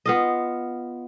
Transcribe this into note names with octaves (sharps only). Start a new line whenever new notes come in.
B3 F4 D#5